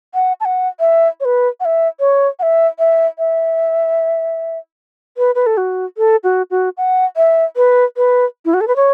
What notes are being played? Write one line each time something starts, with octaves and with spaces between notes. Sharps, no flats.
F#5
A5
F#5
E5
C#5
B4
F#5
E5
C#5
F#5
E5
E5
E5
B4
B4
A4
F#4
A4
F#4
F#4
F#5
E5
B4
B4
E4
F#4
A4
B4
C#5